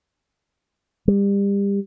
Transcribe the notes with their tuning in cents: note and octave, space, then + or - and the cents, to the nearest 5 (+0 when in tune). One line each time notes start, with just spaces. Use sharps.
G3 +30